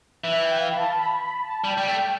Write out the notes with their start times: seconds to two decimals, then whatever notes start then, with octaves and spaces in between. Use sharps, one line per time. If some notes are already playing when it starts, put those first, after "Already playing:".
0.23 E3 E5
0.42 G5
0.59 F5
0.72 B5
0.76 A5
0.94 B5
1.17 B5
1.42 A5
1.64 G3 G5
1.78 G3
1.88 A3 G5